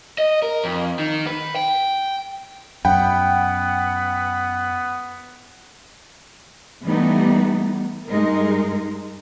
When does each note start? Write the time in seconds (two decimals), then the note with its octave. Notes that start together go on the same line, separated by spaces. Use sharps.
0.18 D#5
0.42 A#4
0.64 F2
0.99 D#3
1.27 B4
1.56 G5
2.85 F#2 B3 F#5 G5 B5
6.85 E3 G3 A3 B3 D#4
8.08 G2 G#3 D#4 A#4